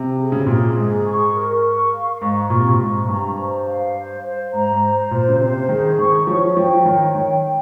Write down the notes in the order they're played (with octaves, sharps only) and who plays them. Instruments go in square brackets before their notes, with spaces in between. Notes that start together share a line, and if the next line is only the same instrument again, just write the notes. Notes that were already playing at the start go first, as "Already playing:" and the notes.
Already playing: [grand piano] C3
[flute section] G#4
[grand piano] C#3
C3
[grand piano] A#2 [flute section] G#4
[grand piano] G#2 [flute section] G#4
[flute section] C#6
A#4
C#6
F5
[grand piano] G#2 [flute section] C#6
[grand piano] A#2 [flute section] C#6
[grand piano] C3
A#2
[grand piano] G#2 [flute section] C#6
[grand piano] G2 [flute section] A#5
[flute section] C5
F5
C5
C5
[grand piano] G#2 [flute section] A#5
[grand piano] G#2
[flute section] C5
[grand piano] A#2 [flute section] C5
[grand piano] C#3
[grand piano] C3 [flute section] C5
[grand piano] D#3 [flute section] G#4
[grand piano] D#3 [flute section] C#6
[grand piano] F3 [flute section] C#5
[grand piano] F3 [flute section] G5
[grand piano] D#3 [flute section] C#5
[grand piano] D#3 [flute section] G5
[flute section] G5